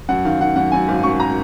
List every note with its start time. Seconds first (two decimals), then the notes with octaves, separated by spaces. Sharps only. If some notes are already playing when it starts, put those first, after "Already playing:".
0.09 F#2 F#5
0.25 D#3 F5
0.40 D#3 F#5
0.56 F#2 F#5
0.72 F#2 G#5
0.88 G#1 F5
1.03 F#2 C#6
1.20 A#5